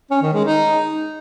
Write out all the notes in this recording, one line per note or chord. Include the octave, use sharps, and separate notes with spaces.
C#4
D#3
G#3
D#4